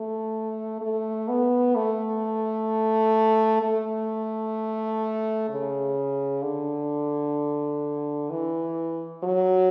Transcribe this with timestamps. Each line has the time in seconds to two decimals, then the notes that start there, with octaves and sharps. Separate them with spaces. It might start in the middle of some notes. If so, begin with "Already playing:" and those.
Already playing: A3
0.81 A3
1.28 B3
1.75 A3
3.62 A3
5.49 C#3
6.42 D3
8.30 E3
9.24 F#3